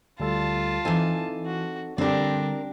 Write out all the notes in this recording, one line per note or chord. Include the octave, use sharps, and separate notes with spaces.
D2 G3 F4 A4 A5
E3 C4 D#4 A4 G#5
F#4
D3 G3 C4 D4 G4 A#4